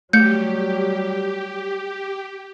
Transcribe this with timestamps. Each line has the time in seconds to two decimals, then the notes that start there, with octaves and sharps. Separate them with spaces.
0.13 F#3 G3 A3 G4 G6 C#7